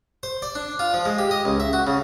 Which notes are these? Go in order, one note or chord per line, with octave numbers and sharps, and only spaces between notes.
C5
D5
D4
F4
F3
G#3
G4
D#5
C#2
E5
F#4
C#3